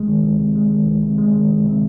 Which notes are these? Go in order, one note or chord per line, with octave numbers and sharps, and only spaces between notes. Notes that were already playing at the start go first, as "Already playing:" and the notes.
Already playing: C2 C3 G#3
D#3
C2
C3
G#3
D#3
C2
C3
G#3
D#3
C2
C3